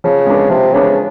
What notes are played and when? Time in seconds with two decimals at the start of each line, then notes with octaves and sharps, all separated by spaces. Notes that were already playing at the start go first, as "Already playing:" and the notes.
0.04 C#3 F3
0.27 G#3 B3 D4
0.50 C3 F3
0.73 C#3 G#3 B3 D4